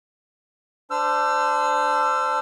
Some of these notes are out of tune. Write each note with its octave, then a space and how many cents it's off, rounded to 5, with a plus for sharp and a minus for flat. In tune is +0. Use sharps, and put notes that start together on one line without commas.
D4 +0 C5 -20 E6 +35